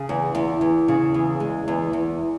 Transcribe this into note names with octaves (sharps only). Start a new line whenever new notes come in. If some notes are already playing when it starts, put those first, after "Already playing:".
Already playing: C#3
E2
E2
E2
C#3
E2
G#3
E2
E2